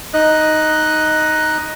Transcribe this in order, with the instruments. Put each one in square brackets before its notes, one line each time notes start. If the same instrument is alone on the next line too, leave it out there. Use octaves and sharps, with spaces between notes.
[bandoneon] D#4 D#5 F#6